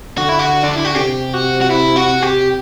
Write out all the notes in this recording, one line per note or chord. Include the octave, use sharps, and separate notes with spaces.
D3 F#4
E4
F#4
D4
E4
F#4
C3 G4
F#4
F#4
E4
F#4
G4